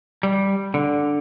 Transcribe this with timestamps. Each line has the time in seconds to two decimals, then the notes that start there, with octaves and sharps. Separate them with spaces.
0.23 G3
0.74 D3